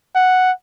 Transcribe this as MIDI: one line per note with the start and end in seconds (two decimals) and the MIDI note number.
0.15 0.52 78